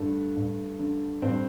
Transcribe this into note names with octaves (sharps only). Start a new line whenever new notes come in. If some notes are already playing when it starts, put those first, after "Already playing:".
Already playing: G2 D3 A3 A4
G2
D3
G2 C4 C5